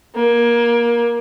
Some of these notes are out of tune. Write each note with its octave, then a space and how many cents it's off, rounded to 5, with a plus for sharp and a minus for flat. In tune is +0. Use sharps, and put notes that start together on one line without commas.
A#3 +20